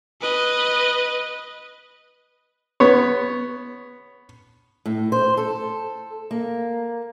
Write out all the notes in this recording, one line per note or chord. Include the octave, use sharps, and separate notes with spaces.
B4 D#5
B3 C#5
A2
C5
A4
A#3